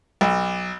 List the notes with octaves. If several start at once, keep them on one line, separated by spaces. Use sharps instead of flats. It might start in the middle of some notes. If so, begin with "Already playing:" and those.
B1